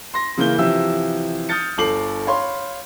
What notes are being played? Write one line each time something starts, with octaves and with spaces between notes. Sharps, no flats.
C6 A#6
C#3 E3 A#3 E4 G6 G7
C3 E3 F3 G4 E5 E6
D#6 F6 G6 A6 C#7
G1 A4 D6 C7 F#7
C#5 F5 B5 C6